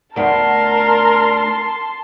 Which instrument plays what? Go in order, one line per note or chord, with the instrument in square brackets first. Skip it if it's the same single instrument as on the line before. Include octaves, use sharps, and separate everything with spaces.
[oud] D2 B3 [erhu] A#4 [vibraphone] D5 [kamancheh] A5 C6